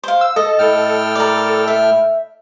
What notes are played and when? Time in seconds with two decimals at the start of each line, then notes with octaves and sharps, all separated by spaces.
0.04 C5 F5
0.21 E6
0.36 A4 D#5
0.59 A2 A4 G5 F6
1.15 A#4 D5
1.68 E5